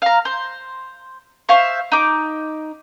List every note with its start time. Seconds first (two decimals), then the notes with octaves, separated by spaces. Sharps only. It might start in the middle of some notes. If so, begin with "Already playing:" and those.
0.02 F5 A#5
0.25 C5
1.49 C5 E5 F5 C#6
1.92 D#4 D6